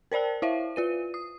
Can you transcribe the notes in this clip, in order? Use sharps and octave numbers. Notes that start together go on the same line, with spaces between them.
A#4 C5 D5 G5 A5
E4 C5 E5 F5
F4 B4 D#7
D#6